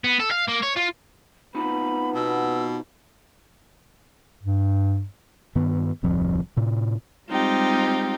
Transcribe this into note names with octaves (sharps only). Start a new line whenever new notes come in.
B3
A4
F5
A#3
C#5
F4
B3 C4 D#4 F4 B5
B2 E6
G2
G2 D#3 B3
D1 C2 F2 F3
A2 C3
G3 G#3 C4 D#4 F4 G4